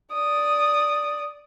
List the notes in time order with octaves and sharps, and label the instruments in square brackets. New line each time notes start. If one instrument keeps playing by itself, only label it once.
[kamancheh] D5 D#6